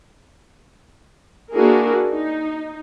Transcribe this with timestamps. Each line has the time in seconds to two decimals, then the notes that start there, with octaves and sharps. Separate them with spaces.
1.53 A#3 D4 E4 F#4 G#4 A#4
2.12 D#4